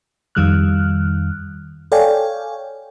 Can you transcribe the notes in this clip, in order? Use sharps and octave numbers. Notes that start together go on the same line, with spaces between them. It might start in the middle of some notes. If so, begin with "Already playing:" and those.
F2 D#3 G3 F6 F#6
A4 C#5 D5 F5 G5 G#5